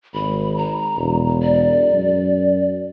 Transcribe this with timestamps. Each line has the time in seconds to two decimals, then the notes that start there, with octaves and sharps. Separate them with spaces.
0.14 G#1 B5
0.58 A#5
0.97 E1
1.43 D5
1.91 F#2